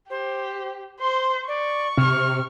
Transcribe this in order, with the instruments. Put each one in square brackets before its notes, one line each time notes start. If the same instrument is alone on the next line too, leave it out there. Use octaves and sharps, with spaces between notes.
[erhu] G4 [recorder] C5
[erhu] C5 [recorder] C6
[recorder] D5 [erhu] C#6
[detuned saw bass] C3 [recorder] F6